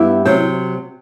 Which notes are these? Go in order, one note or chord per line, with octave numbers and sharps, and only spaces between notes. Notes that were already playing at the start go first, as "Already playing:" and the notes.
Already playing: G2 B3 E4 G4
C3 F#3 C4